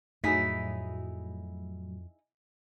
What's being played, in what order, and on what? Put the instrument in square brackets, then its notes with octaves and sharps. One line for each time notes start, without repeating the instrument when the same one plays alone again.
[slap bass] F2 [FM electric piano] A2 F#3 [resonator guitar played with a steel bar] D#4 E4 G#4 [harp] B6